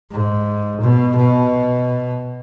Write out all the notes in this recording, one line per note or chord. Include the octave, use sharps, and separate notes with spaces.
G#2
B2
B2